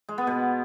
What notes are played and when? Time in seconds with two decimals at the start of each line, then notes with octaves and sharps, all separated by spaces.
0.09 G#3
0.18 B3
0.27 B2